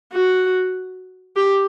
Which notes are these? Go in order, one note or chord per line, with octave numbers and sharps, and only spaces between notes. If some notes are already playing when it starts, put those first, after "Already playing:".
F#4
G4